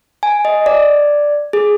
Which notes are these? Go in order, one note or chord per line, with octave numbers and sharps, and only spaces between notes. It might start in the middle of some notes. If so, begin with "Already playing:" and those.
G#5
D#5
D5
G#4